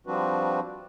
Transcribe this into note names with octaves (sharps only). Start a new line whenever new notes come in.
F3 G3 C4 D4 F#4 B4